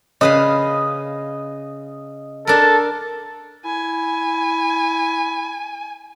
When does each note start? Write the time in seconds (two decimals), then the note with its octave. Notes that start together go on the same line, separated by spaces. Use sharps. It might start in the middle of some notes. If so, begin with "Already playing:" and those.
0.21 C#3 B4 D#5 F5
2.47 D4 A4 A#4
3.65 E4 G#5